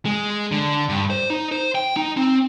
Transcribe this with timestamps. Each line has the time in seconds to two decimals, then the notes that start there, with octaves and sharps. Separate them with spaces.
0.06 G#3
0.52 D3
0.89 G2
1.10 C5
1.30 D#4
1.52 C5
1.75 G5
1.96 D#4
2.17 C4